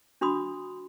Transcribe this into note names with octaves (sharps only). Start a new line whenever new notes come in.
D4 F#4 B5 C6 D#6